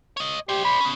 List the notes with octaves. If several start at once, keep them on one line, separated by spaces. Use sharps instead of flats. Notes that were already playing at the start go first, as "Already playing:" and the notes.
C#5 D#5
G4 C5 D5
B5
B3 C#4